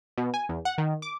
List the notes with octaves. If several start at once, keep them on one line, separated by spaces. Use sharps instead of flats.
B2
G#5
E2
F#5
D#3
D6